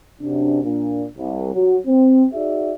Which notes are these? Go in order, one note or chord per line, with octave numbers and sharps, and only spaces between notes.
F#2 C3 D4
A#2 D4
C2
F#3 F#4
C4
D#4 F#4 G#4 D5 E5